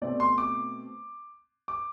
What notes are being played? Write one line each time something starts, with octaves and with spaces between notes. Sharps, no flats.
B2 A3 C4 D5
C6
D6
D6